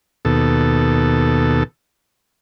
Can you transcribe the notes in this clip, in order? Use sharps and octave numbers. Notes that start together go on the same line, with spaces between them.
D#2 B2 A4